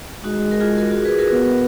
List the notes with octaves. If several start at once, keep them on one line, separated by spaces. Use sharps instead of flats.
G#3 D#4 F#4
A#4
F4 G#4
F#4 A#4
F#4 A#4
G#4 B4
F#4 A#4
B3